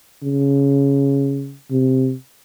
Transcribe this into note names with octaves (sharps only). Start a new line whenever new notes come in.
C#3
C3